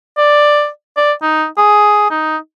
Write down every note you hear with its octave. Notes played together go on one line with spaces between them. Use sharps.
D5
D5
D#4
G#4
D#4